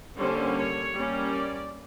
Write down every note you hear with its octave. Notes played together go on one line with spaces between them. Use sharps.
D3 G3 A#3 C#4 C5
C#5
G3 A#3 C#4
D5